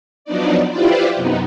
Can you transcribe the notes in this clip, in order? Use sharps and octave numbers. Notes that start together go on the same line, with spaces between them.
F3 F#3 B3 D4 D#4 D5
E4 F4 G4 B4 C5 D5
F#2 C3 B3 D#4